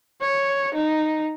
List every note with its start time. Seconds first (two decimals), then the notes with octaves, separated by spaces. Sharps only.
0.21 C#5
0.74 D#4